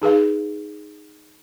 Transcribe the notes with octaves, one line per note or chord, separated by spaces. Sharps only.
D#4 G#4 B4 F5